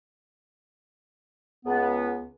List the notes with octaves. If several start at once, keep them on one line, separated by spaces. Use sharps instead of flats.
C#2 B3